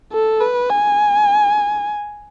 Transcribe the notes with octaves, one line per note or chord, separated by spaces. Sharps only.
A4
B4
G#5